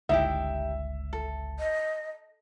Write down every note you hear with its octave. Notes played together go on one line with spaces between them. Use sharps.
G1 C#2 D#4 E4 G4 E5
A4
D#5